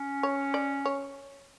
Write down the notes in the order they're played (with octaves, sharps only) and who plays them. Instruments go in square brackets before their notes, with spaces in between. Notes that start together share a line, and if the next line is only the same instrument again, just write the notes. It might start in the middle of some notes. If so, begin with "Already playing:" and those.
Already playing: [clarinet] C#4
[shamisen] C#5
D5
C#5